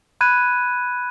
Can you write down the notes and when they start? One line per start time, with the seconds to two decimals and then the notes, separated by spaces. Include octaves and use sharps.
0.21 B5 F#6 G#6 D#7